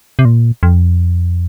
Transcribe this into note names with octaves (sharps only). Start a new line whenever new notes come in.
C3
A#2
F2